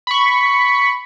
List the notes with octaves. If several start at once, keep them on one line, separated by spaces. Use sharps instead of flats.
B5 C#6